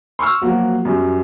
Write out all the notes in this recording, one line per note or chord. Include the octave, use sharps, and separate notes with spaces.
C6 C#6 E6 F6
F3 F#3 A#3 F#4
F#2 G3